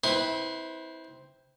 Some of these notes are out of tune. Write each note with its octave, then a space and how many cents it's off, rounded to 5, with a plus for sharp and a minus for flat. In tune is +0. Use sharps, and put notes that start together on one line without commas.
C4 +0 E4 -30 B4 +0